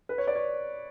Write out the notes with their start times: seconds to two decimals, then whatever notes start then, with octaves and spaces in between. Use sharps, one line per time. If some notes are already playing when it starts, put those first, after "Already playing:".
0.09 B4
0.18 C#5
0.27 D5
0.35 C#5